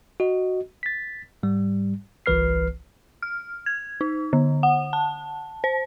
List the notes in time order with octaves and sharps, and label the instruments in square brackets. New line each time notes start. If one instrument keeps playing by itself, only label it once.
[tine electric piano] F#4 D#5
A6 B6
G#2 G3
G1 C2 E3 B4 F6 C7
[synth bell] F6
G#6
D#4
D3
F#5
A5
C5